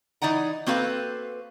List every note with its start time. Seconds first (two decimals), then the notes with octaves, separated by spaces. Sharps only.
0.22 E3 D#4 D5 F#5 A#5
0.66 A#3 C4 F#4 A4 B4 F5